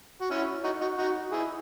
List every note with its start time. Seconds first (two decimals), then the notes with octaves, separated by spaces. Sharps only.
0.21 F#4
0.31 C#4 E4
0.64 D#4 F#4
0.80 D#4 F#4
0.98 D#4 F#4
1.32 E4 G#4